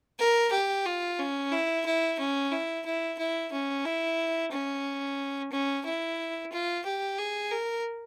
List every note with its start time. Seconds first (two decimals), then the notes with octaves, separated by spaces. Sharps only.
0.19 A#4
0.52 G4
0.85 F4
1.19 C#4
1.52 E4
1.85 E4
2.19 C#4
2.52 E4
2.85 E4
3.18 E4
3.52 C#4
3.85 E4
4.52 C#4
5.52 C#4
5.85 E4
6.52 F4
6.85 G4
7.18 G#4
7.51 A#4